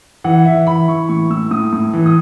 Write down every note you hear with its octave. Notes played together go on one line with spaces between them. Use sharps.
E3 F#5
E3 E5
E3 B5
E3 C#6
A2 C#6
A2 E6
A2 D#6
A2
E3
D#6